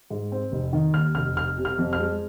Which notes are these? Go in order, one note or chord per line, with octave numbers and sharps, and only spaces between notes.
G#2
C4
F1
D#3
D#2 F6
F1 F6
F1 F6
C3
F6
F2
F6
G#3